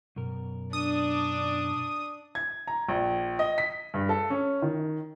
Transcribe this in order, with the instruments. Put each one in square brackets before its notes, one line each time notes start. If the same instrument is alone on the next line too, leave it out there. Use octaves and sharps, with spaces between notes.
[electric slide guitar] F#2 B2 A#4
[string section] D4 [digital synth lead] D#6
[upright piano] G#6
A#5
A#1
D#5
B6
G2
A4
C#4
D#3